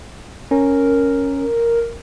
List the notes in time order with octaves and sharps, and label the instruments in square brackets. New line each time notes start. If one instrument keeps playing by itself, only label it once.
[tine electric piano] C#4 [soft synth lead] A#4